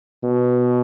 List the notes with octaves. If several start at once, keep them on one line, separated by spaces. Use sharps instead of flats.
B2